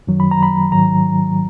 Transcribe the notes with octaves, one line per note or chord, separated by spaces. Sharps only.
F#2 D#3 F#3
B5
A#5
B5
G#2 D#3 F#3 A#5